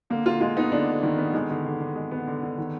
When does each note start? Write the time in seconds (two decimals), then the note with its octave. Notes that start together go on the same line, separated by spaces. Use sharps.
0.10 D3 A#3
0.26 D3 F4
0.41 G#3 F4
0.57 B3 D#4
0.72 D3 D4
0.88 D3
1.03 D3 D#3
1.18 B3
1.34 D#3 G#3
1.50 D3
1.65 D3
1.80 D3
1.96 G#3
2.11 B3
2.27 D3
2.43 D3
2.58 D#3